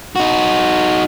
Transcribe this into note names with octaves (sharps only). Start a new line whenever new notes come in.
D#4 F#4